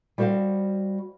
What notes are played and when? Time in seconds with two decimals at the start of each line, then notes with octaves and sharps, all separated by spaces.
0.18 G3 F#4 C5 D#5 F5